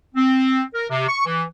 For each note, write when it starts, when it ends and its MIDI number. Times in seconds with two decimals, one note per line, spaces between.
0.15 0.62 60
0.74 0.84 70
0.90 1.06 48
1.07 1.23 85
1.26 1.42 52